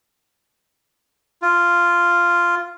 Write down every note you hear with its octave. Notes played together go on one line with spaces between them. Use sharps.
F4